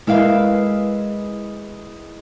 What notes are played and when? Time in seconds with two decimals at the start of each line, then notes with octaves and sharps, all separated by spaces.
0.07 G#3 E4 A#4 B4 F5